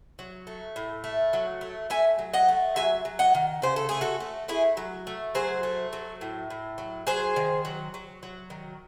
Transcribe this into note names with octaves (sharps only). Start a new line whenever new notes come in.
F#3
A3
A2
A3
F#3
A3
A3 E5 G#5
F#3
D#5 F#5
A3
F#3 E5 G#5
F#3
D#5 F#5
D#3
C#3 C5
A4
A3 G#4
F#4 A4
A3
A3 E4 G#4
F#3
A3
F#3 G#4 C5
A3
F#3
A2
A2
F#3
F#3 G#4 C5
D#3
F#3
F#3
F#3
D#3